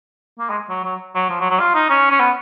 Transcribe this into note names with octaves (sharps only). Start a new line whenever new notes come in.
A#3
G#3
F#3
F#3
F#3
F3
F#3
F#3
F4
D#4
C#4
C#4
B3